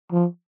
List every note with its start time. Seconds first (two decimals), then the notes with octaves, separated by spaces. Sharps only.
0.12 F3